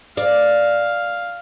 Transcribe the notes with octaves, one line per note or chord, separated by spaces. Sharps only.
D5 F5